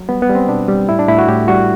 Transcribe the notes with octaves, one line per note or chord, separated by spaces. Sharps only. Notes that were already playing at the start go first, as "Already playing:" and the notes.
Already playing: F#3
G3 B3
B3
G3
C4
B2 D4
G3
A2 E4
D4
A2 E4
F#4
A2 G4
G3 F#4